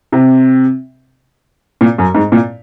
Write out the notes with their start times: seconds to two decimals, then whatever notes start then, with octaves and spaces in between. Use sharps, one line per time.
0.12 C3
1.81 A#2
1.98 F#2
2.15 G#2
2.32 A#2